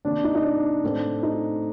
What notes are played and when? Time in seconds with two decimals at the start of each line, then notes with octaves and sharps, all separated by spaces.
0.05 C3 D#3 A#3 D4
0.24 D#4
0.35 D#4
0.44 D4
0.83 A2 A3 C4
1.23 D#4